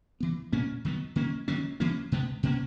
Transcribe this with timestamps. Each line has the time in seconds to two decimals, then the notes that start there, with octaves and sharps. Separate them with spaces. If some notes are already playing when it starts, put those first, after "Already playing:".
0.20 E3 B3
0.52 A#2 A#3 C#4
0.85 D#3 F#3 B3
1.16 D#3 A#3 C#4
1.48 D#3 F#3 A#3 C#4
1.80 E3 A#3 C#4
2.12 B2 G#3 B3
2.43 B2 A#3 C#4